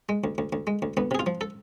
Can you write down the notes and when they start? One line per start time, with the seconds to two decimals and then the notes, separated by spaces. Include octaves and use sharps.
0.09 G#3
0.24 D2
0.38 D2
0.53 D2
0.67 G#3
0.82 D2
0.97 D2 B3
1.11 C3 G#4
1.19 F4
1.26 F3
1.41 A4